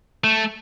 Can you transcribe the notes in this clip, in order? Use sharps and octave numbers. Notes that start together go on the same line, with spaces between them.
A3